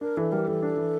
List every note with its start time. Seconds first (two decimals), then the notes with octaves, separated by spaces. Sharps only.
0.01 D4 A#4
0.17 E3 A4
0.32 G3 A#4
0.47 E3 A4
0.62 D4
0.77 E3